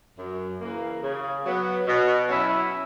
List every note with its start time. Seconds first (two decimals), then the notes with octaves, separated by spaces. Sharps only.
0.19 F#2
0.61 C#3 E3 A#3
1.03 C#3
1.45 F#3 B3
1.87 B2
2.29 F#3 C#4 E4